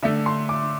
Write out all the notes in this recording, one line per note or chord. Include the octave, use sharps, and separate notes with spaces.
D3 A3 E5
C6
D6